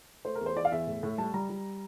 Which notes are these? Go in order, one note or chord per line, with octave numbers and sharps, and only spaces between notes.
A3 C5
A#4
E2
C5
E3 D5
F5
E2 E5
A2
A2
G3 A5
G3 A#5
G3